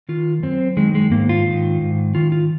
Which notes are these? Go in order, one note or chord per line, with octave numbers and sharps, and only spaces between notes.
D#3 F4
F#2 C4
D#3 G#3
G#3
G#2 A#3
F4
D#3
G#2
D#3 F4
F4